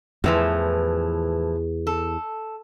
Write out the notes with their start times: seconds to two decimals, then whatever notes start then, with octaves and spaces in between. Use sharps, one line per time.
0.24 E2 A2 E3 F3
1.87 A4